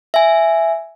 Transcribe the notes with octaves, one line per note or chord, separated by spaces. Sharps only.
E5 G#5